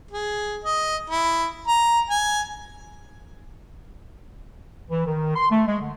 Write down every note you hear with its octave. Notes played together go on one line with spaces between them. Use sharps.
G#4
D#5
E4
A#5
G#5
E3
D#3
C6
A3
G#3
D3